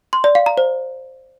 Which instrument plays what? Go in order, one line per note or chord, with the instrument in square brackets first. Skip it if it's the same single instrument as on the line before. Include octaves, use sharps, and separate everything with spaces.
[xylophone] C6
D5
F5
A#5
C5